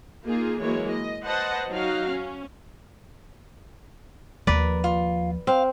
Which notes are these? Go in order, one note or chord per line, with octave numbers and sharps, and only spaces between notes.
A#3 D#4 F4 G#4
E3 F#3 G#3 A#3 C#5
D#5
B4 C5 D#5 F#5 A5
F#3 D#4 F#4 F5
C#4
D#2 F3 A#4 B4 D5
F4
C4 F5